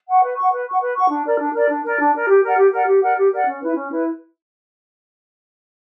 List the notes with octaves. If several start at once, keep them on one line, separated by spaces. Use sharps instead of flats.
F#5 C#6
B4
F#5 C#6
B4
F#5 C#6
B4
F#5 C#6
D4
A#4 D5
D4
A#4 D5
D4
A#4 D5
D4
A#4 D5
G4
A#4 D5 F#5
G4
A#4 D5 F#5
G4
A#4 D5 F#5
G4
A#4 D5 F#5
C#4
E4 B4
C#4
E4 B4